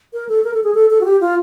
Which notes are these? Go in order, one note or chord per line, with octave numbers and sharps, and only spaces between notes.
A#4
A4
A#4
A4
G#4
A4
A4
F#4
G4
F4